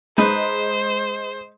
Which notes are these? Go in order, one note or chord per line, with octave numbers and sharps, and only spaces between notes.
G#3 D#4 B4 C5